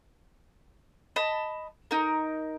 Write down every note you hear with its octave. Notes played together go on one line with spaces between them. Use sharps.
D#5 A5 B5
D#4 A#4